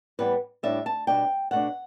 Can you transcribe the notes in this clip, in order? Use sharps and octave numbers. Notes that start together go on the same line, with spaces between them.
A2 E3 G3 B3 B4
A2 G3 D4 E5
A5
B2 G3 D4 G5
B2 A3 D4 F#5